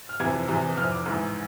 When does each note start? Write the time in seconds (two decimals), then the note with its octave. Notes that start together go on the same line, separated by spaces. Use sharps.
0.09 F6
0.20 F1 F2 C3 E3 G#6
0.48 E1 E2 C3 E3
0.77 F1 F2 E3 F6
0.92 D6
1.06 A1 G#2 E3